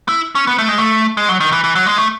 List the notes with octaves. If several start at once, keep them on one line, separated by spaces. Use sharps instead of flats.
E4
C#4
B3
A3
G#3
A3
G#3
F#3
D#3
E3
E3
F#3
G#3
A3